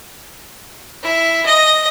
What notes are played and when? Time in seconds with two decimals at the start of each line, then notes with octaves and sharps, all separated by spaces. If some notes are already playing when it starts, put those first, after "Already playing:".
1.03 E4
1.46 D#5